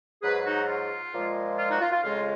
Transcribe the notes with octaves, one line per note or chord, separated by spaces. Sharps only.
G#2 F#3 G#4 B4
D#4 F#4
F4
A#2 F3 G#3
F4
D#4 F#4
F4
F4
F2 C#3 G#3 F4